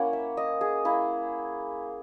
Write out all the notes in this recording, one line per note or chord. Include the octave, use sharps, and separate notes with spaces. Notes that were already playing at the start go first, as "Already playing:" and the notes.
Already playing: A#3 C#4 E4 F#5
E5
D#5
G#4
A#3 E4